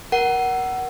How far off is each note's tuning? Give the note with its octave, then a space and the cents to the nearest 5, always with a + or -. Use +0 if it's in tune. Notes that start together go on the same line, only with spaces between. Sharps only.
A#4 +20 F#5 +20